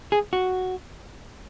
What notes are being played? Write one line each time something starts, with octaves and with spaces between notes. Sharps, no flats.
G#4
F#4